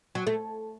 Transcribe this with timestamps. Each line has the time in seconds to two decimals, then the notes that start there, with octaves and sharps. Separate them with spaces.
0.15 F#3
0.27 A3